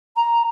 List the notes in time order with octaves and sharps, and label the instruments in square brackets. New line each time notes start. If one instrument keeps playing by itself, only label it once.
[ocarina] A#5